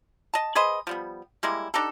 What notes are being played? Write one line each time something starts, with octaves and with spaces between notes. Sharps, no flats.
D#5 A5
G#4 B4 C5 D#5
F3 G3 B3
G3 G#3 A#3 E4
D4 D#4 G4 A4